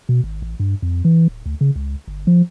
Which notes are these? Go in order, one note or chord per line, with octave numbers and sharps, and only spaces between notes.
B2
G#1
A1
G2
F2
E3
D1
D2
C#3
C#2
G1
F3